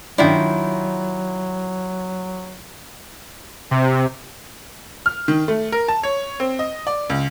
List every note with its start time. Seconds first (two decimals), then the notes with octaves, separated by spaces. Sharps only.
0.18 D#3 F#3 D4 E4 F4 G5
3.71 C3
5.06 F6
5.28 D#3
5.48 A3
5.72 A#4
5.88 A5
6.03 C#5
6.40 C4
6.59 D#5
6.87 D5
7.10 C#2